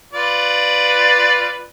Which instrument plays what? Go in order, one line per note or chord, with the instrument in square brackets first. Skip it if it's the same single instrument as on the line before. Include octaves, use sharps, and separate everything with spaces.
[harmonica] F4 B4 D5